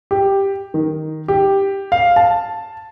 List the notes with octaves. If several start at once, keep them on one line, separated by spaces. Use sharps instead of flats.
G4
D#3
G4
F5
A5